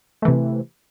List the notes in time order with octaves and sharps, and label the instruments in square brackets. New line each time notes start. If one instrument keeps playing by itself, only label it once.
[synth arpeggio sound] A3
E3
C3